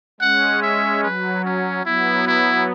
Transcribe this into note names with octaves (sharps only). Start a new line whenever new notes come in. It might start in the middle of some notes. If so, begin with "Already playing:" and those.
G#3 C#4 F#5
E5
F#3 B4
C#4
F#3 B3 E4
E4